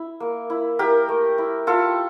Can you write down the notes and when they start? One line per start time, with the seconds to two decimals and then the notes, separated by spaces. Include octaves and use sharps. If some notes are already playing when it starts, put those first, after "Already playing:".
Already playing: E4
0.20 A#3
0.50 E4
0.79 E4 G4 A#4
1.09 A3
1.38 E4
1.67 E4 F4 A4